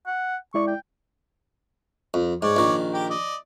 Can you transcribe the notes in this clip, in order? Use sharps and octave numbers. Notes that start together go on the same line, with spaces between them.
F#5
G#3 E4 D5 C#6
G5
F2
G#2 C#5 D5
A#1 D#3
G4 A#4 G5
D5 D#5